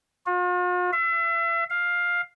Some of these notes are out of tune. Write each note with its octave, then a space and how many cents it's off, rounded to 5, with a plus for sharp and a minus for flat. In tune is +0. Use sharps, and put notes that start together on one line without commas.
F4 +45
E5 +35
F5 +10